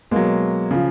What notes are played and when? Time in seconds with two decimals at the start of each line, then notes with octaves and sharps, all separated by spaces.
0.11 B2 F#3 G#3 A#3
0.71 C#3 F3